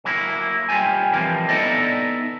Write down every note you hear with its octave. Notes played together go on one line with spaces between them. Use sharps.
F#3 A#3 E4
D#2 G3 F4 G4 G#5
E3 F3 G3 A#3 C4
B3 D#4 E4 A4 D5 D#5